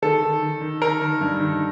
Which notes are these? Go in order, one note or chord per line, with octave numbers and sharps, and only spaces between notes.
D#3 A4
D#3
D#3
D#3
D#3 A#4
D#3
G2
D#3